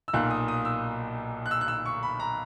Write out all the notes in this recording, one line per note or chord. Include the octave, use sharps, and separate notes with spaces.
E6
B1 A#2 A#3 F#6
D#6
D#6
E6
F#6
E6
F#6
E6
C#6
B5
A#5